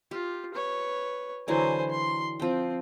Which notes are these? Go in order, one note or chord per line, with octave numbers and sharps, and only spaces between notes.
F4 G4
B4 C#5
D3 E3 F#3 C5 G#5
C6
F3 C4 G5